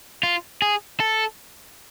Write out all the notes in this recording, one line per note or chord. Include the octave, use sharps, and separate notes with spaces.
F4
G#4
A4